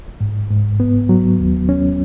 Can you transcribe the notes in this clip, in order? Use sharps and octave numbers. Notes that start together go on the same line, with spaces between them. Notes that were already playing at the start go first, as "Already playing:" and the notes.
G#2
G#2
B3
F#3
D#2
C#4